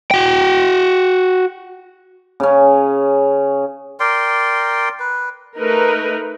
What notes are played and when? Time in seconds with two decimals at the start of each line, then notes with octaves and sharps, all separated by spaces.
0.11 F#4 G5
2.40 C#3 C#4
4.00 A#4 D5 G5 C6
5.00 B4
5.57 A3 D#4 A#4 B4